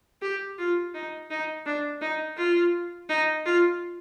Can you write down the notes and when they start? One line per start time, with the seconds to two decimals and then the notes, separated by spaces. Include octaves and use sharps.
0.22 G4
0.58 F4
0.94 D#4
1.30 D#4
1.66 D4
2.01 D#4
2.37 F4
3.09 D#4
3.45 F4